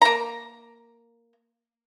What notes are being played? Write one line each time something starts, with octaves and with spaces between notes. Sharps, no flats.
A#3 A#5